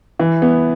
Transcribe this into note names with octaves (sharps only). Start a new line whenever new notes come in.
E3
B3